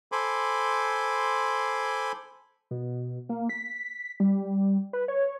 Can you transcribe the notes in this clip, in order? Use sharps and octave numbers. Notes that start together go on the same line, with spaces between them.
A4 C5 G#5 B5 C6 D6
B2
A#3
B6
G3
B4
C#5